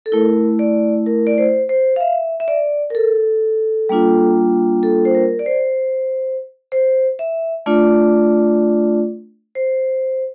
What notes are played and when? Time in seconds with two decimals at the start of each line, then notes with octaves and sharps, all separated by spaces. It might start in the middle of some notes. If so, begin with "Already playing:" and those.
0.06 A4
0.12 A3 E4 A#4
0.59 D5
1.06 A#4
1.27 D5
1.38 C5
1.69 C5
1.96 F5
2.00 E5
2.40 E5
2.48 D5
2.90 A#4
2.95 A4
3.89 G3 A#3 D4 F4
4.83 A4
5.05 C5
5.15 A#4
5.39 D5
5.46 C5
6.72 C5
7.19 E5
7.66 A3 D4 F4 D5
9.55 C5